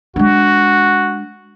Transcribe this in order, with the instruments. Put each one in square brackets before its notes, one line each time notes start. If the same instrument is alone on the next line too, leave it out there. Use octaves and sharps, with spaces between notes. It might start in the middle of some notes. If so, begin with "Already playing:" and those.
[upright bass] G#3 D4 [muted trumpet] F#4